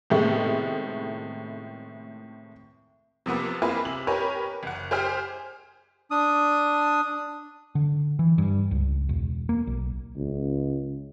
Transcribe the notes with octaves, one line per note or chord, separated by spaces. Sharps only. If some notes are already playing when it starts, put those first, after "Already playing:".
A2 C3 D#3 G#3 A3 B3
C3 F3 A#3 B3
A#3 C4 E4 F4 G#4 B4
C3 F#7
G4 A#4 B4 C#5 G#5
F#1 F#5
G4 G#4 C5 G5 F6
D4 D#6
D3
E3
G2
C#2
E1
A#3
B1
C#2